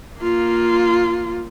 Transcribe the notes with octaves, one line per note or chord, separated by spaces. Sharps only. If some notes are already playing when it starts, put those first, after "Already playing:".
A#3 F4